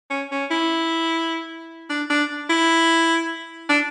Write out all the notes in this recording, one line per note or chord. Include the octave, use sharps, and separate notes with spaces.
C#4
C#4
E4
D4
D4
E4
D4